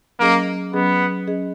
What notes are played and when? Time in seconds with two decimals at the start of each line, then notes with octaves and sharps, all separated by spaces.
0.20 F#3 A#3 C#4 G#4 D#5
0.74 F#3 B3 C#4 G#4 D#5
1.27 F#3 C#4 G#4 D#5